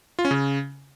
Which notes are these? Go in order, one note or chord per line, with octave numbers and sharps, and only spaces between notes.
F4
C#4
C#3